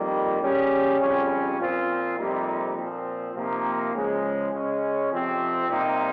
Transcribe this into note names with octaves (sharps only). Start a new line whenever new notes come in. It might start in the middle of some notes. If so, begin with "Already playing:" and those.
Already playing: F2 D#3 G3 A#3
C#3 G3 C#4 G4
F2 C#3 G3 C#4
A#2 F3 C4 F4
F2 C3 G3 A#3 D#4
A#2 F3 C4
C3 F3 A#3 D#4
C#3 F3 G#3
C#3 G#3 C#4
F2 C3 F3 C4 G4
C3 G3 A#3 D#4